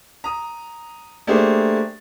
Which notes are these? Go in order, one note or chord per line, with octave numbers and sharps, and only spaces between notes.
A#5 D#6
A3 A#3 D4 G4 G#4 C5